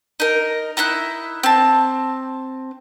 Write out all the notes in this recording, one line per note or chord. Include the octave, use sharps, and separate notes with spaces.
D#4 A#4
D#4 E4 E5 F#6
C4 A5